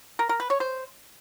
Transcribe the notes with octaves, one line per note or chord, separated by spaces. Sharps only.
A#4
A#4
B4
C#5
C5